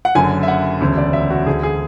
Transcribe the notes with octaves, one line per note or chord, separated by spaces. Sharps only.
F#5
F#1 F#2 D3 G#5
E5
F#5
E1 D2 C#3
D5
E5
F#4
D2 D3 G#4
G#4